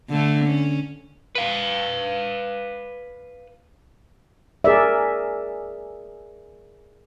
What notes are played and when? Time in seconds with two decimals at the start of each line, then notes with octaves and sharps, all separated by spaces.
0.10 D3 A3
0.46 C#4
1.35 B4 F5
4.64 G#4 A#4 D5 E5